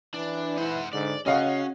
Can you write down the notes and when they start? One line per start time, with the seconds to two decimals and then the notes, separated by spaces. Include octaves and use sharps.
0.14 E3 D4
0.57 E4 C5 F#5
0.93 G#2 D3 D5
1.26 C#3 C#4 F#4 D#5 F5 F#5